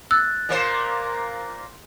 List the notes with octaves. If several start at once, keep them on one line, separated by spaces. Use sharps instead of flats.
E6 F#6 A6
A#2 A#3 C5